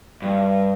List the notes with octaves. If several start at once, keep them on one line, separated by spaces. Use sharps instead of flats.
G2